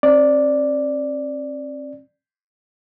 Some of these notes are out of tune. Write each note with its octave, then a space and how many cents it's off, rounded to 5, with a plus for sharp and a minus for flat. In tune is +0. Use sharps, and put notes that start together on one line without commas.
C4 +40 D5 +0